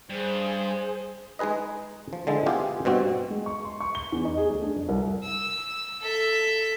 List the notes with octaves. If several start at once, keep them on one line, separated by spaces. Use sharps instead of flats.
G2 G#4 C5
G#3 D#4 G#4 B4 D#5
F3
D3 F3 G#3 E4
B3 E4 F4 G4 G#4 B4
G2 B2 C4 F#4
G#3
C#6
C6
C#6
G7
E2
D#4
G#4
D2
D4
F2
C2
E6
A4 E5